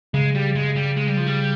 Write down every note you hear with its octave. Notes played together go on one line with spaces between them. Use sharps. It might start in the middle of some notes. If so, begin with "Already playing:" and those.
C#3 G#3
G3
G#3
G3
G#3
G3
F3
G3